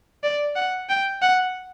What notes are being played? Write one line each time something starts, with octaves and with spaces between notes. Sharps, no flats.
D5
F#5
G5
F#5